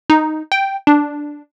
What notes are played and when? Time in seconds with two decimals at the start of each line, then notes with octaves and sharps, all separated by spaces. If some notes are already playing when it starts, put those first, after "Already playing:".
0.10 D#4
0.52 G5
0.87 D4